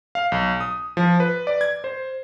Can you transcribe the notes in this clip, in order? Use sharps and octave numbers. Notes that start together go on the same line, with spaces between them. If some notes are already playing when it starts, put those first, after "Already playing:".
F5
B1
D#6
F3
B4
D5
G#6
C5